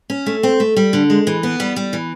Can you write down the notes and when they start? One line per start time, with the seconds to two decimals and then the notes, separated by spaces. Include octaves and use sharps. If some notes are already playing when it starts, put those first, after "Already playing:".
0.10 C#4
0.26 A3
0.43 C4
0.60 A3
0.76 G3
0.93 D3
1.10 G#3
1.27 E3
1.43 B3
1.60 G3
1.76 G3
1.93 E3